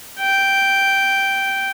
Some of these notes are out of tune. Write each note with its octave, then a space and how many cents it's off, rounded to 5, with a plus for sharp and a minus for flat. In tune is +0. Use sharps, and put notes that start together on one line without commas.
G5 -5